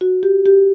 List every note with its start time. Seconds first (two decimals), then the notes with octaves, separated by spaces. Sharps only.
0.01 F#4
0.23 G4
0.46 G4